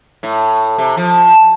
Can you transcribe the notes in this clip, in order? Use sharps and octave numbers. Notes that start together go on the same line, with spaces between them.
A2
C3
F3